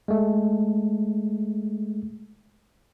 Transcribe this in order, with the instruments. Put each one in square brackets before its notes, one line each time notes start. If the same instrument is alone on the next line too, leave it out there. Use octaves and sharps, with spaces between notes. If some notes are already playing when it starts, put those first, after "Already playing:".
[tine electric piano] G#3 A3